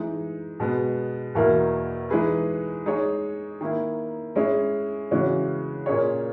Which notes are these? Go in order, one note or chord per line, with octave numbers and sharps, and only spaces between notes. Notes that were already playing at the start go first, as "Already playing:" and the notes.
Already playing: E3 G#3 D#4
B2 G#3 B3
E2 B2 A#3 E4 A#4
E3 G#3 D#4 G#4 B4
G#3 D#4 G#4 C#5
D#3 A#3 E4
G#3 C#4 E4 G#4
C#3 E3 G#3 C#4 F#4
A#2 A#3 C#4 G#4 C#5